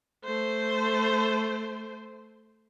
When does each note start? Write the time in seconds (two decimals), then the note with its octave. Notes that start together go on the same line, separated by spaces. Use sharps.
0.24 A3 C5